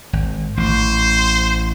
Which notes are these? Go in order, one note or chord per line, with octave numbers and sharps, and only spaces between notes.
G#1
A1 C5